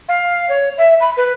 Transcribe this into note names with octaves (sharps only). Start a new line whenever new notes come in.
F5
C#5
E5
B5
B4